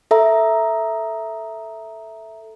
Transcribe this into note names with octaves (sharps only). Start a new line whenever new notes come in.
A4 E5 A#5